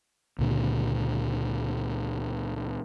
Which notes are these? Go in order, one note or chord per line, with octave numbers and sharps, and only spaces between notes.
C#2 A#2 D3